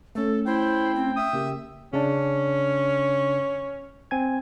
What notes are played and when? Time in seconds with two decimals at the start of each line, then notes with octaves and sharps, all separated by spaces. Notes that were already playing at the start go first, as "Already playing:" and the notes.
0.15 A3 C#4 A4
0.46 E4 C5 G5
0.95 C4
1.17 E5 D#6
1.33 C#3 A#3 G4
1.93 C#3 C#4 D4
4.11 C4 G#5 G#6